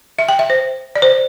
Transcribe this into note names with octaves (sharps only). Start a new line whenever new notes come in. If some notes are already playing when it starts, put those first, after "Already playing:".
E5
G5
E5
C5
D5
C5